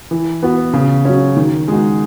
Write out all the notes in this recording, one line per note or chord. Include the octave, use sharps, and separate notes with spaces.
E3
B3 F#4
C#3
F#3 C#4
D#3
G#3 D#4 F#4